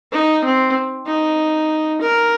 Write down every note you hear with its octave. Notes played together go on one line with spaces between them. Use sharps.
D#4
C4
D#4
A#4